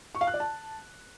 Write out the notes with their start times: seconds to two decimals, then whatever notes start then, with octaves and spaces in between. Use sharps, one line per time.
0.15 C#6
0.21 F5
0.27 F#6
0.34 D5
0.40 A5